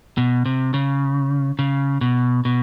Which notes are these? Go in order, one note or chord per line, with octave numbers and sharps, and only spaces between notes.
B2
C3
C#3
C#3
B2
B2